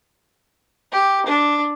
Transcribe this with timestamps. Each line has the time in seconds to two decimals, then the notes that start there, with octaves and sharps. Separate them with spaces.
0.92 G4
1.26 D4